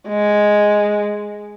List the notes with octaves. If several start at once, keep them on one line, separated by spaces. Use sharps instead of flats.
G#3